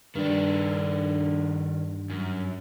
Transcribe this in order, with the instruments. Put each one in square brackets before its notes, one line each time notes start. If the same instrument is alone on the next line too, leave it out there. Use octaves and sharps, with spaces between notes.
[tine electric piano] G2 [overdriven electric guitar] D#3 D4
[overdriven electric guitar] F#2